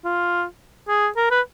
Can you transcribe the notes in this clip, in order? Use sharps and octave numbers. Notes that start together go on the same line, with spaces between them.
F4
G#4
A#4
B4